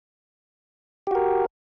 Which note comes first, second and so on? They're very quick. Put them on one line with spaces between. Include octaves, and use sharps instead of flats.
G4 F#4 A#4